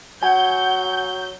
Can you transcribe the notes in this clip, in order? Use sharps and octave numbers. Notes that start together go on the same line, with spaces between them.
F#3 F#5 G#5 G6